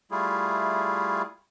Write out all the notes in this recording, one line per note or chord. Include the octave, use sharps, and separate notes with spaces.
G3 A3 E4 F4 G#4